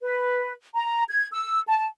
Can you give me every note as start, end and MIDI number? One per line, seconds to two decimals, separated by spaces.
0.01 0.51 71
0.74 1.02 82
1.09 1.26 92
1.31 1.60 88
1.67 1.85 81